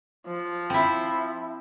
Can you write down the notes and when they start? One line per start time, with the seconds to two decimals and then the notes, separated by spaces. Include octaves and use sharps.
0.27 F3
0.70 C4 E4